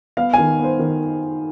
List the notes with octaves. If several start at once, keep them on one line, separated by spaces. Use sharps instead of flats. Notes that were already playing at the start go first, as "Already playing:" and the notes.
B3 F5
D#3 G#5
B3 C5
D#3